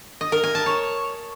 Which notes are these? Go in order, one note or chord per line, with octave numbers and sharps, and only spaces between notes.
D#5
A#4
G#5
A5
C#5